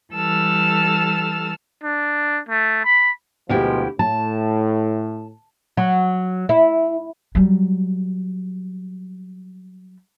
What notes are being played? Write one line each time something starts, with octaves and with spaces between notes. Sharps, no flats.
E3 G3 A4 A5 E6 F6
D4
A3
B5
D2 B2 F3 G#3 E4 G4
A2 A5
F#3
E4
F#3 G3